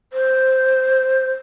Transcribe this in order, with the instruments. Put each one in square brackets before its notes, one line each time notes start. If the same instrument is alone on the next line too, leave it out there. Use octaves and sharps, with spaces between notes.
[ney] C5